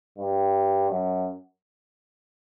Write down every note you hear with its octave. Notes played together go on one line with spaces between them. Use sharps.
G2
F#2